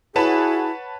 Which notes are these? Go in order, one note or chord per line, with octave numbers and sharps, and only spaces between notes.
E4 F#4 G#4 B4 C#5 F#5 A5 B5